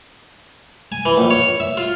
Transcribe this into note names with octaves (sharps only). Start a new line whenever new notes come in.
G#5
E3
A#1
C#5
E5
F4